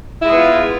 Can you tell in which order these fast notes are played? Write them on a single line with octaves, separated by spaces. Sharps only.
E4 G#3 G#4 B3 F4